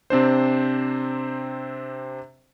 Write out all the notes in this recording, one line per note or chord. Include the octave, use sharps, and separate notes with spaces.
C3 C4 D4 C5